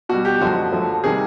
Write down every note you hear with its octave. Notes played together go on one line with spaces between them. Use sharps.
B2 G3 F#4
G4
F#2 D3 F3 G#3 F#4
F#2 D3 F3 A3
C3 D#3 G3 G#4